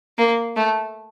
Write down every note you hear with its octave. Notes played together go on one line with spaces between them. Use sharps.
A#3
A3